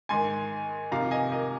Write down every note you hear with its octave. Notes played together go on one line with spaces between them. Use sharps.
G#2 D#3 G#5 C6
F2 C3 D#3 F5 A#5
D#5 G#5
A#4 D#5